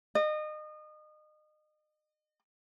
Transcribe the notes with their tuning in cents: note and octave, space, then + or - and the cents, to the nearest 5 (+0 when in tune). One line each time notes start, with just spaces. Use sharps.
D#5 -30